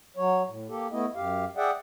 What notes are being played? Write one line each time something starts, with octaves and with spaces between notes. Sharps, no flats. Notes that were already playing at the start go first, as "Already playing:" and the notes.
F#3 C#5
A2
A#3 G4 A4
A3 B3 E4 D#5
F#2 G4 F5
G#4 D5 E5 F#5 G5